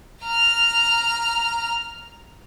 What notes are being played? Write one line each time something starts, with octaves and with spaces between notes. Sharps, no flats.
A#5 F6